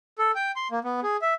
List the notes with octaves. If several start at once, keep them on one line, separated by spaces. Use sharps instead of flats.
A4
G5
C6
A#3
B3
G#4
E5